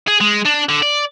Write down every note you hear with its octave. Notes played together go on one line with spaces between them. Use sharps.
G#4
G#3
D4
D3
D5